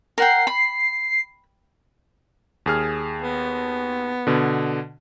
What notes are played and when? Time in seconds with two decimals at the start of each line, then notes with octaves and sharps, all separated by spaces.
0.18 A#4 F#5 G5 C7
0.47 B5
2.66 D#2 G#4 F6
3.22 B3
4.27 B2 D3